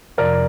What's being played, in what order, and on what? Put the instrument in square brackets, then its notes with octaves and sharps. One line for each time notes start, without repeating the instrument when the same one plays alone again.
[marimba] F2 C3 F3 [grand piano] A#4 D5